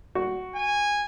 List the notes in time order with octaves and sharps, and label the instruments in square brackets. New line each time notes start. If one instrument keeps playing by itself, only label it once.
[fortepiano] F#4
[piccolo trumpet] G#5